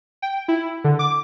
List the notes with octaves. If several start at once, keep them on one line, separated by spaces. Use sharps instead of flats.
G5
E4
D3
D6